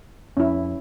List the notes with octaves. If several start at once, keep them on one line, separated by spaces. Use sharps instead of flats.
F2 C#4 E4